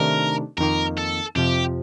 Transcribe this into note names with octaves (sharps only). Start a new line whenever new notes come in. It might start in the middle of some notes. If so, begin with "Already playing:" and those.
Already playing: C3 D#3 A3 D4 A#4
F2 D#3 A#3 A#4
A4
F2 C3 F3 G4